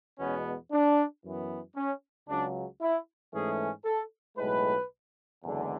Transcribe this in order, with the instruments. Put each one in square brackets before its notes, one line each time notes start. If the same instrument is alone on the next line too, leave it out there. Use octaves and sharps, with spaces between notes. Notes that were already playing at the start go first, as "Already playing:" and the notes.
[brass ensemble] E2 B2 G#3 B3 C#4
D4
F#2 E3 B3
C#4
C#2 C#3 F#3 D4
E4
G#2 E3 A3 C#4 G#4
A4
B1 A2 G#3 B4
F#1 E2 D3 G#3